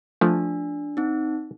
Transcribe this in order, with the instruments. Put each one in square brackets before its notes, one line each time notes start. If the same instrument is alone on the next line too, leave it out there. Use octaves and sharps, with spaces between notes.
[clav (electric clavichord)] F3 A3 [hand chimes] D4
[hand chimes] C4 D#4